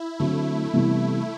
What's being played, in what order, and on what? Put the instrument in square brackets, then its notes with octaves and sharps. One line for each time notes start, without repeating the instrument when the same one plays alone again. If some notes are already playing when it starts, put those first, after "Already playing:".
Already playing: [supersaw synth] E4
[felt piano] D3 F#3 C4 [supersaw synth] A3
[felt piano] C3 E3 G3 B3 E4